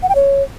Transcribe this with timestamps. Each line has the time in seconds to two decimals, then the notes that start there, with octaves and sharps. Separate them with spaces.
0.03 F#5
0.09 G5
0.15 C#5